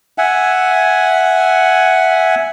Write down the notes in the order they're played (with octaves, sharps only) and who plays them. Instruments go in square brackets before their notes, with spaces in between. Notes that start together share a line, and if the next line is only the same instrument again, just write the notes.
[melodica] E5 F#5 G#5